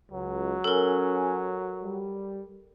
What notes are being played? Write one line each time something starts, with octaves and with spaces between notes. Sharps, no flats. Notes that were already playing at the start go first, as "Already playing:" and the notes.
C#2 F#3
C#4 A4 A#4 G#5
G3